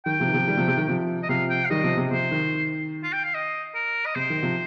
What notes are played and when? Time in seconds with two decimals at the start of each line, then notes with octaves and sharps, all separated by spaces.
0.06 D#3 G5
0.20 C3 F3
0.28 D#3
0.34 C3 F3
0.48 D#3 G3
0.57 C3 F3
0.68 C3
0.78 D#3
0.88 C3 F3
1.23 D#5
1.29 C3 F3 F5
1.50 G5
1.65 F5
1.70 D#3 G3 D#5
1.84 C3 F3
1.97 C3
2.11 C3 F3 C5
2.31 D#3
3.03 F4
3.13 G5
3.24 F5
3.35 D#5
3.75 A#4
4.06 D#5
4.15 C3 C5
4.30 D#3
4.42 C3 F3